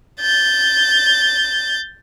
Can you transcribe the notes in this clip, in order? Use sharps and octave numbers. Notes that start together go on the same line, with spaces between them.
G6 A6